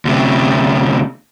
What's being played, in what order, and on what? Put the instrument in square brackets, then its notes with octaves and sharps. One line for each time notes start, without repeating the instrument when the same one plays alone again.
[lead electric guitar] D2 C3